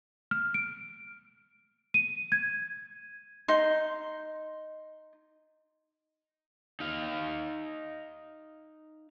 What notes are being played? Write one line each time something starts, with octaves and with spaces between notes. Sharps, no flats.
F6
D7
D#7
G#6
D#4 C6
D#4 F5